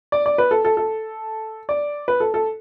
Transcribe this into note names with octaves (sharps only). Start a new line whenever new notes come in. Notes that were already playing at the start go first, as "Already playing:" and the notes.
D5
D5
B4
A4
A4
A4
D5
B4
A4
A4